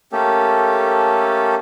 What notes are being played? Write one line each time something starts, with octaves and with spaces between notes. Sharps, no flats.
A3 A#3 C#4 G4 A4